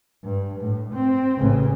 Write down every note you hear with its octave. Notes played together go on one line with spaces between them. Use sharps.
G2
A2
C4
A1 C#3